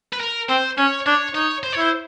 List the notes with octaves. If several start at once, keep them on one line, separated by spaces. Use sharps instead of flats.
B4
A#4
C4 C5
C#4 C#5
D4 C#5
D#4 C#5
C5
C#5
E4 C5